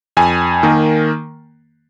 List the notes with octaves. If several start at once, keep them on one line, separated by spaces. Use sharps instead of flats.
F2 G#5
D#3 A#3